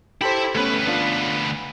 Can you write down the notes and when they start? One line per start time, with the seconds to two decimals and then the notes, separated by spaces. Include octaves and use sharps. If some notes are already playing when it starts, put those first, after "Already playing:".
0.21 E4 G4 A4 C5 B5
0.55 D2 A3 B3 C#4 B4
0.86 B3 D4 F4